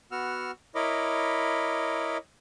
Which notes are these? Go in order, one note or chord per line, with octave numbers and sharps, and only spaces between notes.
B3 F#4 F#5 E6 F6
E4 A#4 C#5 D#5 B5 D6